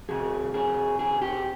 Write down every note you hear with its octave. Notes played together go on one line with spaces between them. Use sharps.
F2 C3 G#4
G#4
G#4
G4